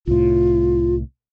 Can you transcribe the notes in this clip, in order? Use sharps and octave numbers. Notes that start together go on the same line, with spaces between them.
C2 A2 F4